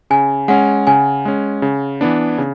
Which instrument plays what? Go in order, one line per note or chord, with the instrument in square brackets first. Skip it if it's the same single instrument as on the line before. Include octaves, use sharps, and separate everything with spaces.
[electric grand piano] C#3 [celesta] G#5
[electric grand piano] G#3 C#4 [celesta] F#5
[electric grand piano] C#3 [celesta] G#5
[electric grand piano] G#3 C#4
C#3
E3 B3 D4
C#3